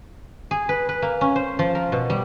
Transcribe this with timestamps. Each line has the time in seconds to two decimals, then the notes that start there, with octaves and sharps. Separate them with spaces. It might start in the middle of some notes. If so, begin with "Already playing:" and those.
0.51 G#4
0.69 B4
0.89 B4
1.02 A#3
1.21 C#4
1.36 C5
1.59 F3
1.75 A#4
1.92 B2
2.10 G3